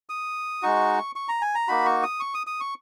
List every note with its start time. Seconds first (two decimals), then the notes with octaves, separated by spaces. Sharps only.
0.09 D#6
0.62 G#3 D#4 F#4 C#6
1.16 C#6
1.28 A#5
1.42 G#5
1.55 A#5
1.68 A#3 D#4 F#4 B5
1.86 C#6
2.03 D#6
2.20 C#6
2.34 D#6
2.47 D#6
2.60 C#6